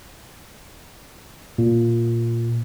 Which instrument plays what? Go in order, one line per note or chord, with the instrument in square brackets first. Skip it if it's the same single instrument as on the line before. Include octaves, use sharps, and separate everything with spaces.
[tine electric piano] A#2